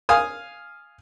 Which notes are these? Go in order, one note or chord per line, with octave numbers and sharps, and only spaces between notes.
F5 G#5 D#6